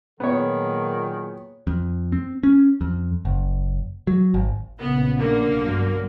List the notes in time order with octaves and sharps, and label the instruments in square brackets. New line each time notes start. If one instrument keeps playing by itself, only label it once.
[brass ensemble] A#2 F#3 G#4 [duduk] D#3 [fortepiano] B3 C#5
[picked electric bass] F2
C4
C#4
F2
F#1
F#3
G#1
[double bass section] A#1 C#3 [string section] B3
[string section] D3 A#3
[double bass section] B1 G2 F#3